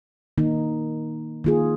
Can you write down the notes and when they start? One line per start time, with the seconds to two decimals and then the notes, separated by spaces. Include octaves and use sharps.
0.38 D#3 A#3 D#4
1.44 D#3 A#3 F4 G#4